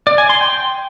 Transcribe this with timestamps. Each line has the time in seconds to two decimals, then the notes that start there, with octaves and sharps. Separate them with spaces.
0.07 D5
0.18 G#5
0.29 C6
0.41 G5